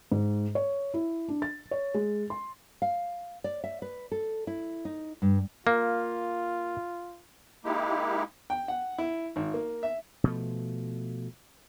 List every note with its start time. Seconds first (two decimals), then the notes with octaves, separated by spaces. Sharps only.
0.12 G#2
0.55 C#5
0.94 E4
1.29 D4
1.42 A6
1.71 C#5
1.94 G#3
2.30 C6
2.82 F5
3.44 D5
3.64 E5
3.82 B4
4.12 A4
4.47 E4
4.85 D#4
5.22 G2
5.67 A#3 F4
7.65 G#3 A#3 D#4 E4 G4
8.50 G5
8.68 F#5
8.98 E4
9.36 G#1
9.54 A#3
9.83 E5
10.24 B2 F3 A3